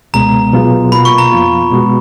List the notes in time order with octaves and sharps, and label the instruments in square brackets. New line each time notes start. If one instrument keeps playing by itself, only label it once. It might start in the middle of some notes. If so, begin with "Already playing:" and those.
[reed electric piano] C#2 B2 G#3 B3 [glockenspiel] A#5
[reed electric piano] B2 F#3 B3 F4 G#4
[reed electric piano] B2 A#3 F4 [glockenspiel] B5
[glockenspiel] C#6
A#5
[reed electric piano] F2 F3 B3 F4
B2 G#3 B3 F#4